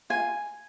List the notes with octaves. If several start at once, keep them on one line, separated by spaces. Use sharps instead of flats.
F4 G#5